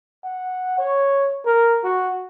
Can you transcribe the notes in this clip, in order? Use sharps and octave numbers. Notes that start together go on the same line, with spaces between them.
F#5
C#5
A#4
F#4